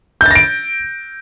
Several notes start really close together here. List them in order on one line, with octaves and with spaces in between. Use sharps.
G6 A6 A#6 D7